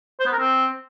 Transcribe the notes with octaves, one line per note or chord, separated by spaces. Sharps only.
C5
B3
A#4
C4